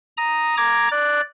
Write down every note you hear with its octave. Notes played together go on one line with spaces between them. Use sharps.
A#5 D#6
A#5 D6 G#6
D5 F#6